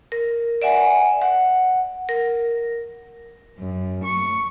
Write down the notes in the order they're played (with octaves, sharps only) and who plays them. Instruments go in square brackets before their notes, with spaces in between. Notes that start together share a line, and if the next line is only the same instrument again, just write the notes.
[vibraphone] A#4
D5 E5 F#5 G#5
F#5
A#4
[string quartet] F#2
C#6